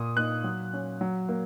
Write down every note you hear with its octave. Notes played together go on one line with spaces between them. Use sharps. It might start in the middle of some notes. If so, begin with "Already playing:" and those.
Already playing: A#2 D#6
A#3 D#4 F#6
F#3
C#4
F#3
A#3